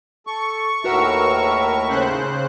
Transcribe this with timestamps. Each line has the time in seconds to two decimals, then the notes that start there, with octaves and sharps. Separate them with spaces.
0.27 A4 C#6
0.84 D#2 A2 F#4 A#4 B4 E5 F#5 E6
1.89 C#3 C5 F#6